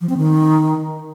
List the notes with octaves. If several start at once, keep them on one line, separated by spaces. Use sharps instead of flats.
F3
C4
D#3